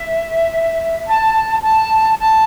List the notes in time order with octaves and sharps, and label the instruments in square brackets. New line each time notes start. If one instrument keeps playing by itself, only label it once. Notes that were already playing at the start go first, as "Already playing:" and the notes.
Already playing: [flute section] E5
A5
A5
A5